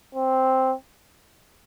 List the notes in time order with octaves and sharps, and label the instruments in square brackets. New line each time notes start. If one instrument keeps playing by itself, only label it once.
[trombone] C4